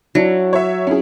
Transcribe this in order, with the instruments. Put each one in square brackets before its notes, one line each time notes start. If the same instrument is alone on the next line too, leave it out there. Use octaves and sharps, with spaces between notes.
[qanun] F#3 [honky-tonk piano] D4 E4
[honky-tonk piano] C#5 E5
C#4 E4 G#4